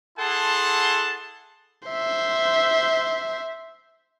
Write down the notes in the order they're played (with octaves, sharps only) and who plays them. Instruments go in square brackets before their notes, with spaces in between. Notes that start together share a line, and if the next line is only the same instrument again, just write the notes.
[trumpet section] E4 G#4 A4 F#5 A5 C6
[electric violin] C5 E5